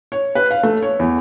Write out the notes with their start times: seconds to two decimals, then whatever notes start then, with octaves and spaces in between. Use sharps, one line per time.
0.12 C#5
0.35 B4
0.51 F5
0.63 A3
0.82 C#5
0.99 E2